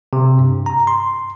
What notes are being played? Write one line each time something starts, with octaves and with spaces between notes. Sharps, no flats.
C3
G2
A#5
C6